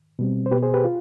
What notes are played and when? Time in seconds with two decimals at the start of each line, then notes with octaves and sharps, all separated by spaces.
0.19 B2 G3 C4
0.46 C5
0.51 B2 B3 G4 B4
0.63 G#4 C5
0.74 G4 B4
0.84 F4